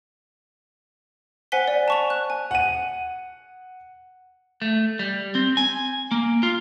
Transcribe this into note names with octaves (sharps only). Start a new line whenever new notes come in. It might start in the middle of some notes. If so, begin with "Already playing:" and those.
C5 F#5 G#5 F#6 B6 G7
D5
A5 C#6 F7
F#6
G#5
F#5 D#7
A3
G3
C4
G#5
A#3
F4